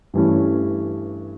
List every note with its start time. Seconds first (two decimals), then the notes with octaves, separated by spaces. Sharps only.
0.14 G2 E3 A3 C#4